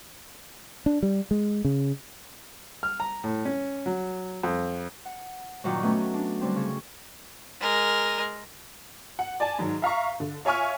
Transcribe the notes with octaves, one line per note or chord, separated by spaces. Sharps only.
D4
G3
G#3
C#3
F6
A#5
A2
C#4
F#3
F2
F#5
G2 A#2 D#3 F#3
A3 B3 C#4 B4
D4
D3 G3 C4
C#3
G#3 A#4
F#5
D5 G#5 A5
G#2 D#3 F#3
E5 F5 A#5 C#6
D3
F4 C#5 E5 G#5 C#6 F6